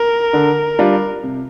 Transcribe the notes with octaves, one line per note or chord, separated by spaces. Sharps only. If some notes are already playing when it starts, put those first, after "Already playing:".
Already playing: A#4
D3
G3 D4 F4
C3